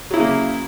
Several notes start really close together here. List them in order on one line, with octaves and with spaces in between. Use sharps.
F#3 E4 C#3 A#3